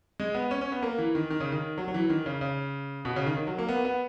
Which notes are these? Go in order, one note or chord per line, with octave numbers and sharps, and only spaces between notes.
G#3
B3
C#4
C#4
B3
A#3
E3
D#3
D#3
C#3
D#3
F#3
F#3
E3
D#3
C#3
C#3
B2
C#3
D#3
D#3
F#3
A#3
B3
B3